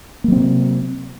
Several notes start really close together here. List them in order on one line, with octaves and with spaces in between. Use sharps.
A#3 F#3 C4 C3